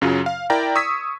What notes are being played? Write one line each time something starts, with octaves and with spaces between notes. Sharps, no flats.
F#2 C#3 F#3 F4
F5
E4 A#4 D5 G5 A#5
C#6 D#6 E6 G#6 B6